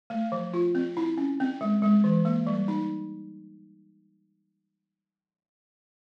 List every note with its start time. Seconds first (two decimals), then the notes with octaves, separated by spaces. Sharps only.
0.10 A3
0.32 F3
0.54 F4
0.75 C4
0.97 E4
1.18 C#4
1.40 C4
1.61 G#3
1.82 G#3
2.04 E3
2.25 A#3
2.47 G3
2.68 D#4